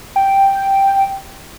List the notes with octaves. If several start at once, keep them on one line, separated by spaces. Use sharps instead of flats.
G5